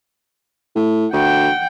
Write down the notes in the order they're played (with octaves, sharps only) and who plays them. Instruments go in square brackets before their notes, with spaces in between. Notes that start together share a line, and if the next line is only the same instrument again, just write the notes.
[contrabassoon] A2
[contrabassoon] D2 [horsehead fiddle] F#5 G5